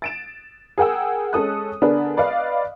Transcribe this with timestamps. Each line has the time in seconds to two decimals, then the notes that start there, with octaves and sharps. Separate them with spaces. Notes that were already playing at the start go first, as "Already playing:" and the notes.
0.02 A6 D7 E7
0.78 G#4 A#4 F#5 G5 E6
1.33 G#3 C#4 A4 D#6 F#6
1.82 D3 B3 D4 G#4 A#4 B4
2.17 B4 D5 D#5 F5